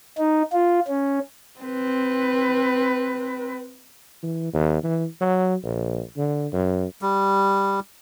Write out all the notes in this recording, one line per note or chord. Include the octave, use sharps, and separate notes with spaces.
D#4
F4
C#4
C4 B4
E3
D#2
E3
F#3
A#1
D3
F#2
G3